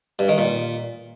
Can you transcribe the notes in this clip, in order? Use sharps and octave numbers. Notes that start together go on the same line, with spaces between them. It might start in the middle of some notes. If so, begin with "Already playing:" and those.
G2
D#3
A#2